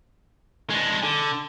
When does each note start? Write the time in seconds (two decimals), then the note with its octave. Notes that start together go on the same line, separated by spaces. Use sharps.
0.70 G#3 D4
1.03 D3